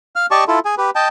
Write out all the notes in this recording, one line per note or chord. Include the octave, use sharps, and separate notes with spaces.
F5 F6
G4 D5 D#5 A5 C#6
E4 F4 A4
G#4 G#5
G4 B4
D#5 G5 A5